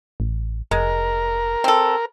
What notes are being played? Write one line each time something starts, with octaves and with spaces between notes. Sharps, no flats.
A1
F1 G#3 A#4
C4 A4